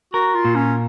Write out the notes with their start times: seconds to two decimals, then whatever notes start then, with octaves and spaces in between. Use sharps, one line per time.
0.13 F#4 A#4
0.35 F4
0.45 A#2
0.55 C#4